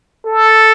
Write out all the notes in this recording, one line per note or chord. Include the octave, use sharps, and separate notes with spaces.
A4